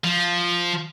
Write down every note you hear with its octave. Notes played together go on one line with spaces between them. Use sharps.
F3